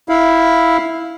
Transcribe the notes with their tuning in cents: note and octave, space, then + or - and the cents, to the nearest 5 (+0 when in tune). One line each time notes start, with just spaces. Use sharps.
E4 -5 F5 +0